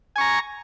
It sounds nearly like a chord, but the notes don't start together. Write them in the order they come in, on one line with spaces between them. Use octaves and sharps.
G#5 C#6 A#5